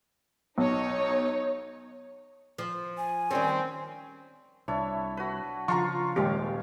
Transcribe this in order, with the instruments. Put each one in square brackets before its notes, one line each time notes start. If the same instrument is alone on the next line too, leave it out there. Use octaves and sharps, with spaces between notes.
[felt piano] B1 [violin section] D#4 C#5
[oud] F3
[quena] G#5
[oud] D#3 G3 C#4 [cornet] C4
[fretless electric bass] C2 [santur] D4 E4 C#5
[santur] F#4 B4
[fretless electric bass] C#3 F3 [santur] F4 F5 [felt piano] A#5 C6 C#6
[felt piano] D#1 [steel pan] G#3 G4 [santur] C#5 F5 D6